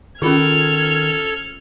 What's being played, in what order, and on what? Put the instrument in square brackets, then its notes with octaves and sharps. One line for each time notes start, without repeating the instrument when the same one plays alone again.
[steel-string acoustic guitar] D#3 [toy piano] C#4 F4 G#4 [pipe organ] A4 [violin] F6 G#6